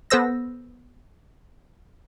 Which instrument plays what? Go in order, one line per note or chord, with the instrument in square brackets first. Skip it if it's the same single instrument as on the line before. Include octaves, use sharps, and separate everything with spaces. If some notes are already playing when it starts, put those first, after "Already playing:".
[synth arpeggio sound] B3 A4 C5 E6 A#6